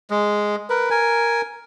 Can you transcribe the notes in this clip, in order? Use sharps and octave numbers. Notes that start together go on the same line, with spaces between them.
G#3
A#4 B4
A#4 G#5